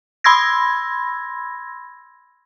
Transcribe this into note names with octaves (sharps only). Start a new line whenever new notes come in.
B5 C6 E6 G#6 A#6